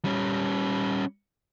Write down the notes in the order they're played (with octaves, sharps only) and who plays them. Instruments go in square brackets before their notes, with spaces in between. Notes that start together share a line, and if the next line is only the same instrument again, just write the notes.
[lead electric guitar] G3 C#4